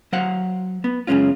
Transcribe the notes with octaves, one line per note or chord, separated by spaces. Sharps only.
F#3 C5 F5 F#5
B3
F#2 C#3 F#3 G#3 C#4 F4